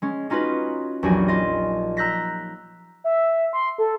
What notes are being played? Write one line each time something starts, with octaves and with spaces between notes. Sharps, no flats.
G#3 C#4
C#4 D#4 F4 F#4 B4
A#1 E2 F#3 F#4 G4 G#5
F4 D#5
A#5 E6 F#6 G6 A#6 B6
E5
C6
A4